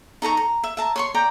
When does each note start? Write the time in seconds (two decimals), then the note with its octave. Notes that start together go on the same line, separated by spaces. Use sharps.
0.22 D#4 A4 A#5 C#6
0.37 A#5
0.64 E5
0.77 E5 A5 A#5
0.96 C#5 C6 C#6
1.14 D5 G5 A#5